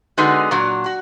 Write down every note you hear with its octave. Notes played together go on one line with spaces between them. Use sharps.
D3 G#3 B3 D#4 F#4
A#2 F#3 D4 F#4
F#4